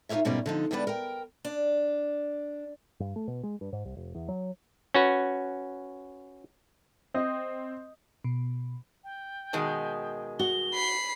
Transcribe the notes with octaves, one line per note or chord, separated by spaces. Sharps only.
D#4 F4 G4 A#4 C#5 E5
G#2 B2 G3 C#4 A#4 D5
D3 F3 D#4
D2 G3 G#3 B3 D4 B4
A#4 G5
D4
G2
A3
B2
G#3
G2
G#2
C2
F1
E2
F#3
C#4 F#4 B4
C4 D#5
B2
G5
B2 D#3 G#3
F#4 G7
B5 C7